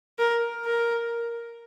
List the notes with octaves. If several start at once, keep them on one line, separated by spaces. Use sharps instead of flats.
A#4
A#4